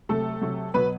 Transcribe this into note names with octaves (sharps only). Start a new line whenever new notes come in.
C3 F#3 A3 A4
C3 F#3
B2 F#3 B3 B4